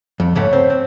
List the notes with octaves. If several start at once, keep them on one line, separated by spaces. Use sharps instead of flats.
F2 A4
C#2 G#2 A3 A4 C#5 G5
C4
C4